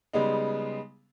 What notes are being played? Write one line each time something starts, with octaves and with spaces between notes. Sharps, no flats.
C#3 G3 G#3 B3 D#4